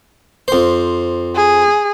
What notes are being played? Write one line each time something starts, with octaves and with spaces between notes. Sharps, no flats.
F2 C5
G#4